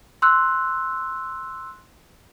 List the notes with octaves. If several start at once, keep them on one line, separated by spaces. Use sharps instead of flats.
C6 E6 F#6